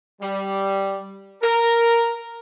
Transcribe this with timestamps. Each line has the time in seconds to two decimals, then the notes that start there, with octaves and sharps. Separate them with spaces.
0.22 G3
1.42 A#4